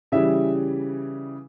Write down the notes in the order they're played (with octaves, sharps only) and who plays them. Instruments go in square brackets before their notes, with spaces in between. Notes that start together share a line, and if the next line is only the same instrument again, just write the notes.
[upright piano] C#3 E3 G3 E5